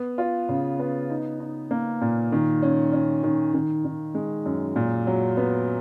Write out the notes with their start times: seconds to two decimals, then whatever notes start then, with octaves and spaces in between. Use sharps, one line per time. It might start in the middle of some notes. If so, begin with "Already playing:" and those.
Already playing: B3
0.18 F4
0.49 C#3
0.79 B3
1.10 D#4
1.40 D#4
1.71 A#3
2.01 A#2
2.32 D#3
2.62 C#4
2.93 C#4
3.23 D#3
3.54 D#3
3.85 D#3
4.15 G#3
4.46 F#2
4.76 A#2
5.07 F#3
5.37 B3